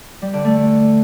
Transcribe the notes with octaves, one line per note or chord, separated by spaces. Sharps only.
G3
D3
A3